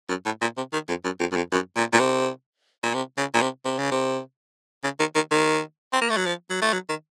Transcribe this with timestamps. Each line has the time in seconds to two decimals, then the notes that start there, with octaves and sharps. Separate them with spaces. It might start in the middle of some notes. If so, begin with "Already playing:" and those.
0.09 F#2
0.25 A2
0.41 A#2
0.57 C3
0.73 D#3
0.89 F2
1.04 F#2
1.20 F2
1.32 F#2
1.36 F2
1.52 F#2
1.76 A#2
1.93 A#2
1.99 C3
2.83 A#2
2.94 C3
3.17 C#3
3.34 A#2
3.41 C3
3.65 C3
3.78 C#3
3.91 C3
4.84 C#3
4.99 D#3
5.15 D#3
5.31 D#3
5.93 C4
6.01 A#3
6.09 A3
6.17 F#3
6.26 F3
6.50 F#3
6.61 A3
6.73 F#3
6.89 D#3